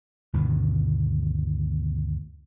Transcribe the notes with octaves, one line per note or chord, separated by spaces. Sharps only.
D2 G2 B2 D#3